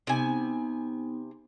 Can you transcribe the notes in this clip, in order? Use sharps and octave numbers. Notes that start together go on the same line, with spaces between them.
C3 B3 D#4 G#5